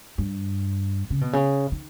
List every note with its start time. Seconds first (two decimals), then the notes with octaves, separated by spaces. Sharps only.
0.18 G2
1.10 C#3
1.21 B2
1.33 C#3
1.72 D#3